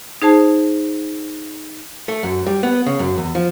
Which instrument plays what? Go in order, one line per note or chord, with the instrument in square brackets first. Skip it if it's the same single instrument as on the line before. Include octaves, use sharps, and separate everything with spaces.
[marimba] D#4 G#4 C5 A5
[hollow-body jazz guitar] A3
F#2
G3
B3
C#3
F#2
E2
F3